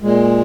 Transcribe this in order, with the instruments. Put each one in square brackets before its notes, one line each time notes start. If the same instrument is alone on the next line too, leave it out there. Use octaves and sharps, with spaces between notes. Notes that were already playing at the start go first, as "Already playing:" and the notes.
[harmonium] A#2 G#3